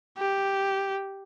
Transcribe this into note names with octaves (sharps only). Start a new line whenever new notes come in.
G4